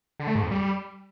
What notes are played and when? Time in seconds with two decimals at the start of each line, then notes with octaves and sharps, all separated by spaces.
0.20 D3
0.27 A3
0.35 G#2
0.43 F2
0.51 G3